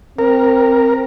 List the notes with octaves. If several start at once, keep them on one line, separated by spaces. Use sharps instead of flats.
C4 A#4